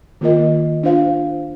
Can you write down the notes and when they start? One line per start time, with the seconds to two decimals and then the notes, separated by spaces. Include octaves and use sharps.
0.21 D#3 A#3 F4 A#4 D#5
0.83 D4 F4 C5 F5